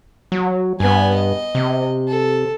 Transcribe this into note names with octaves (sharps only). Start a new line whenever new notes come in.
F#3
G2 B3 G#5
D#5
C3
A4